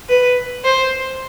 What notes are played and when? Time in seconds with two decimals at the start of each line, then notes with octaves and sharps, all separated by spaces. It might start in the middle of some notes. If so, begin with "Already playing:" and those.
0.09 B4
0.64 C5